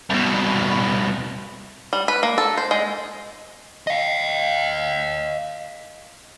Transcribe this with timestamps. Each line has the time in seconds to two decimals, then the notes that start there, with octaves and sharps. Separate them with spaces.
0.10 C2 B2
1.93 G3
2.08 B4
2.23 A#3
2.38 A4
2.57 C5
2.71 G#3
3.87 D#5 F5